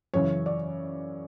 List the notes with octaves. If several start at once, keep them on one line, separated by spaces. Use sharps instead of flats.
F#2 C#3 E3 C#5
D5